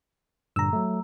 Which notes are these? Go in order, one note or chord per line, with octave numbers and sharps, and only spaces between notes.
G2 A#2 D3 A#5 E6
F#3 A3